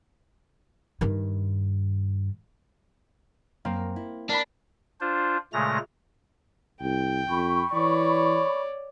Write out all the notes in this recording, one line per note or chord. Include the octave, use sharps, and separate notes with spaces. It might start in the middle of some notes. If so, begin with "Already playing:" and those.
G2 D#3
F#2 A#3 C4 A#4
E4
D4 A#4 B5
D4 F4 C5
A#2 C#3 G#3 A3 A#5 A#6
C2 G5
F2 B5 C#6
E3 C#5 D5